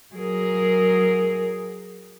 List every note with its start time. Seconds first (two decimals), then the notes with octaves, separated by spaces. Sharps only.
0.15 F#3 G#4 A#4